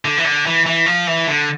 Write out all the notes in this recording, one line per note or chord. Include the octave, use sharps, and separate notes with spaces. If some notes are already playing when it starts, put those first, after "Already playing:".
D3
E3
D3
E3
E3
F3
E3
D3